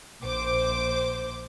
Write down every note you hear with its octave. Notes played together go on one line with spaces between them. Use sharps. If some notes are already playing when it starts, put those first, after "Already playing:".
A#1 C5 D6